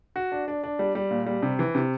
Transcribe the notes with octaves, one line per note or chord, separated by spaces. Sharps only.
F#4
D4
D4
D4
G3
G3
A#2
G3
C3
E3
C3